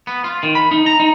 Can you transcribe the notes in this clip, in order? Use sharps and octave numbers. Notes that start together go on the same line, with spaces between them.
B3
F4
D#3
B5
D#4
A#5
D#4